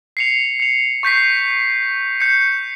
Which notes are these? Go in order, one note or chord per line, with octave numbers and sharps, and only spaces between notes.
C7 C#7 F7
C#7 F7
C#6 G6 B6 C7
G6 C#7